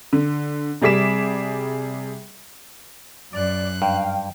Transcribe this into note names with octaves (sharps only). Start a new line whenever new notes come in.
D3
C3 G3 G#4 D6 B6 E7
F#2 D5 F#6
G2 F5 G5